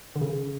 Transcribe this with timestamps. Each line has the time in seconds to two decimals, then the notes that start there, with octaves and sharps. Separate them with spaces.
0.16 D3
0.21 C#3